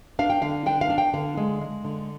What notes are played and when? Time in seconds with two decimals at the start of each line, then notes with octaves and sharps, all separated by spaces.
0.19 D4 F5
0.30 G5
0.42 D3 F5
0.66 D4 G5
0.81 F5
0.90 D4
0.98 G5
1.14 D3 F5
1.37 G#3
1.61 G#3
1.85 D3